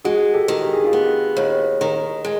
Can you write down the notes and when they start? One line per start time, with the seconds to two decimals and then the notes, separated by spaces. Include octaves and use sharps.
0.04 G#3 F#4 G#4
0.34 G4 A4
0.48 D#3
0.63 G4
0.73 G#4
0.84 F4 G4
0.93 B3
1.37 D#2
1.81 D#3
2.25 G#3